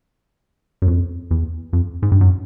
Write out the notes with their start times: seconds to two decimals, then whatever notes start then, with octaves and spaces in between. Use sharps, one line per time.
0.82 F#2
0.88 F2
1.31 E2
1.73 F2
2.03 G#2
2.12 G2
2.21 F#2